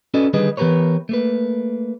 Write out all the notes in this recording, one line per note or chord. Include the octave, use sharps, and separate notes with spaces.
C#4 F#4 A4 B4 D5 D#5
D3 D#3 G3 G#4 B4 D#5
E3 B3 G4 A#4 B4 C#5
A3 A#3 B4